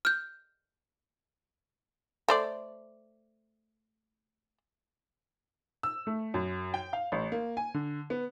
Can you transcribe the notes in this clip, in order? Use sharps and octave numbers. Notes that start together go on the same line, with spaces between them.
F6 G6
A3 C5 D5
E6
A3
F#2
G5
F5
A1
A#3
G#5
D3
B3